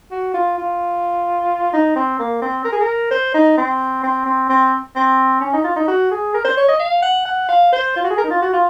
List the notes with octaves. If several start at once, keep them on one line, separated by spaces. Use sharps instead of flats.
F#4
F4
F4
D#4
C4
A#3
C4
A#4
G#4
A#4
C5
D#4
C4
C4
C4
C4
C4
C#4
D#4
F4
D#4
F#4
G#4
A#4
C5
C#5
D#5
F5
F#5
F#5
F5
C5
F4
F#4
G#4
A#4
D#4
F4
F#4
F4